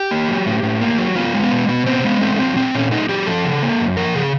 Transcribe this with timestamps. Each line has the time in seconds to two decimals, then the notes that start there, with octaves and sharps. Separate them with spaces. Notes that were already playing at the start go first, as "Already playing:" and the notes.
Already playing: G4
0.11 A#3
0.28 F#3
0.46 A2
0.63 A2
0.81 A#3
0.98 F#3
1.16 B3 F4
1.34 G#3
1.43 B3
1.52 B2
1.68 B2 B3
1.86 B3 C4
2.05 G#3 B3
2.21 A3 C4
2.39 F#3 C4
2.56 A#2 C4
2.74 A#2 C#4
2.91 A3 D#4
3.09 F#3 G4
3.27 F3 A4
3.44 C#3
3.62 A#3
3.80 F#2
3.97 F3 A#4
4.15 C#3 G#4